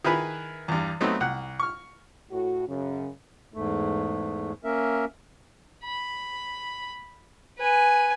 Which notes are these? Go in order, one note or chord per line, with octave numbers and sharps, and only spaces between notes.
D#3 E4 G#4 B4 B5
E2 G2
F#3 A3 B3 C4 D#4
C2 F#5
C#6 F6
A2 F#4
F#2 C#3
E2 G#2 A3
A#3 C#4 A#4 E5
B5
B4 G#5